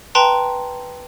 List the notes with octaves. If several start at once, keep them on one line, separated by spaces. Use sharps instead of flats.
B4 G5 A5 A#5 C6